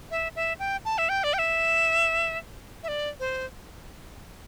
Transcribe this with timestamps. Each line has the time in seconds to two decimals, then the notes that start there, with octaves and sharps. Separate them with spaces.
0.11 E5
0.36 E5
0.59 G5
0.85 A5
0.98 E5
1.09 G5
1.24 D5
1.34 G5
1.39 E5
2.83 E5
2.88 D5
3.20 C5